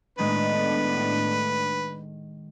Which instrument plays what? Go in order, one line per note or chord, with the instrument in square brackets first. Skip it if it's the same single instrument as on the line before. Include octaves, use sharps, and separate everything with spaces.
[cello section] A2 B3 D4 [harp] D#3 G#3 [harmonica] B4